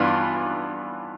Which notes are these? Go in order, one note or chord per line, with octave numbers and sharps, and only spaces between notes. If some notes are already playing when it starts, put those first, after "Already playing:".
Already playing: G2 E3 B3 D4 F4